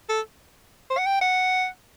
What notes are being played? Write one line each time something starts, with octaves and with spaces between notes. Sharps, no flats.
A4
C5
F#5
G5
F#5